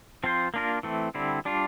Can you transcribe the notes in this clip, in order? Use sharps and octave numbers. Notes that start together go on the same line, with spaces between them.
F3 C4 F4 C5
A#3 D4 F4 A#4
E3 A3 C4
D3 G3 C4 E4
G3 D4 F4